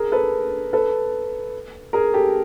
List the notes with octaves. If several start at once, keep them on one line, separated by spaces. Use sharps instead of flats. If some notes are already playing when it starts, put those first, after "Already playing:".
Already playing: G#4 A#4
A4 B4
A4 B4
G#4 A#4
G4 A4